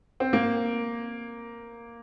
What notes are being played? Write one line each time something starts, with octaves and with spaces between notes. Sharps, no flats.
C4
A#3